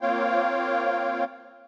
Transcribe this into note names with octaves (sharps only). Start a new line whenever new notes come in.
A#3 C4 F4 C#5 F5 G5